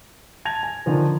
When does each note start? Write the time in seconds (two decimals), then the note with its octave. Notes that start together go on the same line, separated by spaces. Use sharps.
0.45 A5 G#6 A#6 F7
0.63 G#5
0.86 D3 D#3 F3